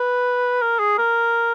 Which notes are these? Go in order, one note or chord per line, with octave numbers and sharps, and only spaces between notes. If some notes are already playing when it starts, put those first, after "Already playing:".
Already playing: B4
A#4
G#4
A#4